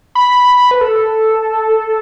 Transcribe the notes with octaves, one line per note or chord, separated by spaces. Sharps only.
B5
B4
A4